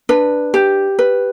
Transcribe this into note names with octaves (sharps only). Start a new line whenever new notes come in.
D4 B4
G4
B4